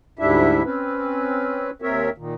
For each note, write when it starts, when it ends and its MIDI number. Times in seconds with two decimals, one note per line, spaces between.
0.19 0.63 38
0.19 0.63 44
0.19 0.63 55
0.19 0.63 62
0.19 0.63 64
0.19 0.63 76
0.65 1.70 60
0.65 1.70 61
0.65 1.70 71
1.82 2.10 39
1.82 2.10 60
1.82 2.10 70
1.82 2.10 73
1.82 2.10 76
2.18 2.34 46
2.18 2.34 51